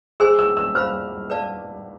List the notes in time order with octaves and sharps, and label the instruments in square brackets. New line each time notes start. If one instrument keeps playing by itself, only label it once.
[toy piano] G#4 C5 G#5 C6 [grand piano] E6
[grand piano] E6
E6
[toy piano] C5 F5 B5 [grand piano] F6
[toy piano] B4 D5 F5 A5